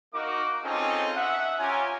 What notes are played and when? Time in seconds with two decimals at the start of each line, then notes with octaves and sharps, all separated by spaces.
0.14 A#3 D#4 F#4 A#4 D6
0.64 C4 C#4 D#4 F4 G#4 A4
1.16 E5 F#5
1.59 C#4 F4 G4 G#5 A#5